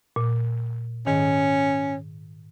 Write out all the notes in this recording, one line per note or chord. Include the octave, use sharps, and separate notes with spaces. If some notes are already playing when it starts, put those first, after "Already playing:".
A#2
G#2 D#3 C#4